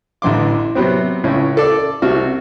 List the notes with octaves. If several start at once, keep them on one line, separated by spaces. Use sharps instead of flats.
A1 D3 E3 C6 D6
C3 F#3 B3 C4
C#2 A2 C#4
A4 D5
C2 C3 F#4 F6